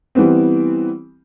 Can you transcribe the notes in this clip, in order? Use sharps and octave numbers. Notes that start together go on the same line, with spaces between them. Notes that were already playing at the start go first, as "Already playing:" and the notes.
E3 G3 B3 C4